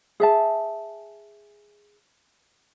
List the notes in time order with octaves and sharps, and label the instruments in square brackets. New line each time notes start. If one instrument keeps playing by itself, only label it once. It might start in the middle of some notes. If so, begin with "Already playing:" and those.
[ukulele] G#4 E5 A5